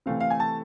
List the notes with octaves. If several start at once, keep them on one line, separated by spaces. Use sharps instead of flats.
C3 E3 A3 C4 F5
F5
G#5
A5